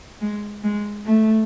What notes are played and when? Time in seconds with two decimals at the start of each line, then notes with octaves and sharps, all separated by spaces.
0.22 G#3
0.64 G#3
1.06 A3